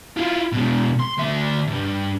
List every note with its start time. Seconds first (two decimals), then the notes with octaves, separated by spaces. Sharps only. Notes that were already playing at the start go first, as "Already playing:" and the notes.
0.17 E4 F4
0.52 B2 G#3
1.00 C6
1.18 D2 E5
1.67 G2 C3